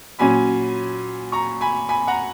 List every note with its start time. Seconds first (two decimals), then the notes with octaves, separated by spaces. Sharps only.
0.19 A#2 F#3 C#4 G#5 B5
1.32 A#5 C#6
1.61 G#5 B5
1.89 G#5 B5
2.07 F#5 A#5